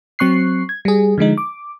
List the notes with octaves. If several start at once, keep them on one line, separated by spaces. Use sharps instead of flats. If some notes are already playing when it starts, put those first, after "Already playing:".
F#3 C4 C#6 F#6 C7
G#6
G3 G#4
D3 F3 G#3 D#4
D6